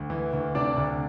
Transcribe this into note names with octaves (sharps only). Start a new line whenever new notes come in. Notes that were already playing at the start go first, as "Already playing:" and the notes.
Already playing: D2
E3
D2
C3 D4 D5
D2